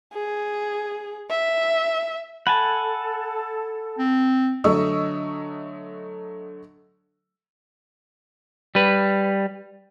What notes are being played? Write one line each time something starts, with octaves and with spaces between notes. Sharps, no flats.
G#4
E5
A4 F#5 G#5 A5 B5
C4
D3 F#3 A3 D#5 C#6 E6
G3 B4